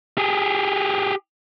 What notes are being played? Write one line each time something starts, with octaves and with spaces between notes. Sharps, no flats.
G4 G#4